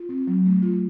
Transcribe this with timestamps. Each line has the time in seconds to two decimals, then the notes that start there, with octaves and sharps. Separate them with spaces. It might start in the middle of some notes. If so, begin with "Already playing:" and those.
Already playing: F4
0.09 C4
0.27 F#3
0.46 A3
0.62 F4